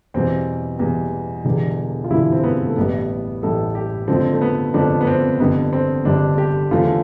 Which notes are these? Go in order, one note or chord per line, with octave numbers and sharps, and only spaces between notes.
E2 B2 G3 C4
E2 B2 G3
E1 E2 D3 G3
F4
E1 E2 D3 G3 E4
C4
B3
A3
A1 A2 G3 B3
A1 A2 G3 A4
G4
F2 D3 F3 A3 C4
A3
B3
F2 D3 F3 A3 D4
B3
C4
G1 F2 D3 G3 B3
C4
G1 F2 D3 G3 D4
G4
E2 D3 F3 A3 F4